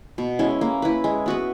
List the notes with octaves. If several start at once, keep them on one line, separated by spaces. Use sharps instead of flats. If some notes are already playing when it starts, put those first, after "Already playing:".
B2
G#3 C#4 E4
A#3
E4 B4
G#3
B3 F#4 B4